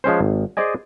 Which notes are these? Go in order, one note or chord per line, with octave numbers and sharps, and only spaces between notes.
F3 G#3 C#4 C5
G#1
G#4 C5 D5 D#5 G#5